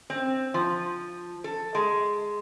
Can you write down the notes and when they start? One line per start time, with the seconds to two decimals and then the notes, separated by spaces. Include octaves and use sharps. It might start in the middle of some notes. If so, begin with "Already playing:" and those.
0.10 C4
0.54 F3
1.44 A4
1.75 G#3